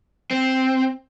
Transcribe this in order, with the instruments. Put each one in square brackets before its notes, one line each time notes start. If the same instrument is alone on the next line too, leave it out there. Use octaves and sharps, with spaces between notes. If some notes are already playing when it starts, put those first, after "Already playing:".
[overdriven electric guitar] C4